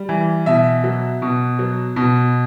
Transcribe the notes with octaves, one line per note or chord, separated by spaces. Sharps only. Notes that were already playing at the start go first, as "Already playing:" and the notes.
Already playing: G3
E3
B2 E5
F#3
B2
F#3
B2